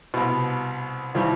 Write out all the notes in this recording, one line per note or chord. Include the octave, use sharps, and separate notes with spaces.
C2 B2
D#2 E3 F3 G3